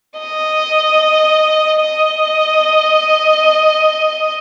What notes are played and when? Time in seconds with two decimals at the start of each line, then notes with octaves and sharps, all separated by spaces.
0.20 D#5
1.82 D#5